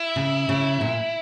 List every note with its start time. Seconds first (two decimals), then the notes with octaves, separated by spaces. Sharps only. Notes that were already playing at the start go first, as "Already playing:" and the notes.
Already playing: E4
0.16 C#3
0.49 C#3
0.81 A#2